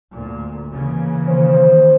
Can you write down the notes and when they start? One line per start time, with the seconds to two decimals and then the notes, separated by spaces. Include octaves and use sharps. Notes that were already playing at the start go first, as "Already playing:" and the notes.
0.13 D2 A#2
0.71 C#3 E3 A#3
1.29 D#3 C5